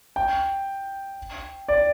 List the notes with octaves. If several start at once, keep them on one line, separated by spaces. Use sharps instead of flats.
G5
D5